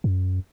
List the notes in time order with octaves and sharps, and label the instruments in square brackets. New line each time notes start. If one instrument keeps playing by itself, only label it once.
[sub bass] F#2